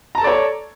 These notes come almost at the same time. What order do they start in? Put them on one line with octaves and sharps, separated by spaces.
A#5 A5 A4 D5 C#5